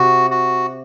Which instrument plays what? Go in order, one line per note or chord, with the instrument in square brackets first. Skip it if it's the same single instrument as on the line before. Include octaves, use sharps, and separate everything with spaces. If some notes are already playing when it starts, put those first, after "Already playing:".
Already playing: [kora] C3 [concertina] F#4
[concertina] F#4